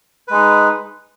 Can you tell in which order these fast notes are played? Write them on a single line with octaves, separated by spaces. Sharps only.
B4 G#3 D#4